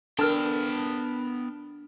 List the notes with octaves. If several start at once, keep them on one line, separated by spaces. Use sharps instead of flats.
B3 D4 A4 A#4 G5 A5 F6